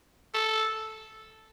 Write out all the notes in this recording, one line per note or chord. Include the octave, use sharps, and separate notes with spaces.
A4